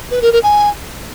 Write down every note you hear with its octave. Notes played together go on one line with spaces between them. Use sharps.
B4
A#4
A#4
G#5